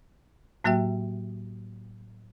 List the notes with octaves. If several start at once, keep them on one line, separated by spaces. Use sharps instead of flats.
A2 F#3 A#3 F#4 E5 G5